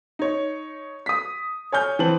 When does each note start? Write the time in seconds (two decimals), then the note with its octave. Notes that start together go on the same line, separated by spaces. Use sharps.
0.19 D#4 C#5
1.06 D#6 B6
1.72 C#5 G#5 F6 G6
1.99 E3 C4 A5 F#7